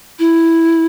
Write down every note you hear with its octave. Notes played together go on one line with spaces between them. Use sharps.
E4